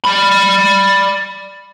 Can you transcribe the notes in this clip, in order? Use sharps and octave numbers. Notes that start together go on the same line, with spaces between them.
D5 B5